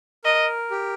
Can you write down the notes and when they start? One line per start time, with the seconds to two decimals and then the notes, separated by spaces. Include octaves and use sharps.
0.24 A#4 D#5
0.71 G4